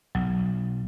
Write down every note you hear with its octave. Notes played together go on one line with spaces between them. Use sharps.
B1 F#3